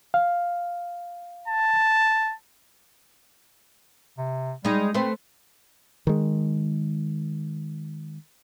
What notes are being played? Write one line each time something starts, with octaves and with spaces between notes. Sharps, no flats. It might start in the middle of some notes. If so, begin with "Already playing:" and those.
F5
A5
C3
G3 G#3 D#4
A3 C4 B4 C5
D#3 G#3